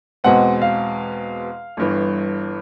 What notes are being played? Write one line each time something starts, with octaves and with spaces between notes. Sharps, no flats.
E2 B2 G#3 C4 F#5
F5
G1 G2 E3